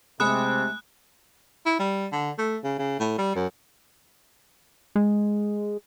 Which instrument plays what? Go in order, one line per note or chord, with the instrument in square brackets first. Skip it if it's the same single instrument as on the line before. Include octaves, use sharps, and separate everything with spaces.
[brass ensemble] C3 [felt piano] G#3 A3 G#4 [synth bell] G#5 B5 D#6 [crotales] F#6
[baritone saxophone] E4
G3
D3
A3
C#3
C#3
A2
G3
F#2
[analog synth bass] G#3